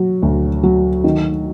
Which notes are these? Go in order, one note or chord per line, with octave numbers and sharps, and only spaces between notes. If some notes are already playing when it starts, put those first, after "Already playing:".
Already playing: F#3
D2
F#3
D#3